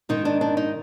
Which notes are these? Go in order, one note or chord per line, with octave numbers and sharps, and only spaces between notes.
G#2 D#3 D#4
D4
D4
D#4